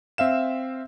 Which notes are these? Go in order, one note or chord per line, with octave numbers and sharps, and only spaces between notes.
C4 E5 F5 E7